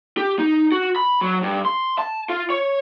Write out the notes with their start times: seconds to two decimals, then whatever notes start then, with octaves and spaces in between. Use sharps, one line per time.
0.17 G4
0.39 D#4
0.72 F#4
0.96 B5
1.21 F#3
1.43 G2
1.65 C6
1.99 A5
2.29 F4
2.50 C#5